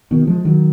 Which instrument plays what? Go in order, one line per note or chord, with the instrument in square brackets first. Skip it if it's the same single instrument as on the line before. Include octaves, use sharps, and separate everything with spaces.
[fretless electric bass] B2 D#3
F3 G#3
D#3 F#3